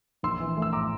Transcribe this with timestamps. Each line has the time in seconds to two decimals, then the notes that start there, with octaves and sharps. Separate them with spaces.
0.23 A#1 C6 E6
0.40 E3
0.57 A3
0.62 E6
0.73 A2 A#5 D6